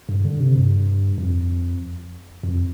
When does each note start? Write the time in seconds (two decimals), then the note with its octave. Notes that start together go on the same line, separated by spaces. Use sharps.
0.09 G2
0.25 D3
0.40 C3
0.55 G2
1.18 F2
2.43 F2